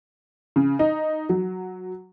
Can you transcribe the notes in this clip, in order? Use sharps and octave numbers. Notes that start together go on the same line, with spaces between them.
C#3
D#4
F#3